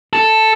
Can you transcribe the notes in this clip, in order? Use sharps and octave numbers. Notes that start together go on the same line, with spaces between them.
A4